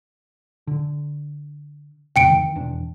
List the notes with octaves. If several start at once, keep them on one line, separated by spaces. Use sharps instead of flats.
D3
E1 F2 C#3 G5 C#7 D7
D#3 E3
E1 E3 D4